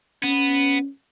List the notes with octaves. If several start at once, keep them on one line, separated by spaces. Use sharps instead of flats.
B3 C#4